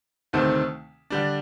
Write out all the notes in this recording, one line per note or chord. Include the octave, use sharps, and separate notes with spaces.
D2 C3 D#3 A3 C4
D3 G3 D4